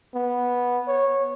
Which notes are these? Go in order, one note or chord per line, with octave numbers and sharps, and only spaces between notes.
B3
C#5